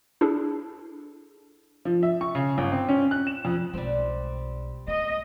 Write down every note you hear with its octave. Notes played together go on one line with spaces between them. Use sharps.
D4 E4 G#4 A4
F3
E5
C#6
C#3
G1
C4
C#4
F#6
E7
F2
B1 G3 G#3 C4
B3 D#5